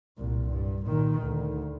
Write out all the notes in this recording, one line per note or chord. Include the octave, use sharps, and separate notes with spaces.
C2 A#2
G2
A#2 D#3
D2